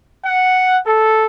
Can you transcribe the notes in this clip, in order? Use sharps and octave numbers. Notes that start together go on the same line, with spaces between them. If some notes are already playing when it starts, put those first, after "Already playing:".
F#5
A4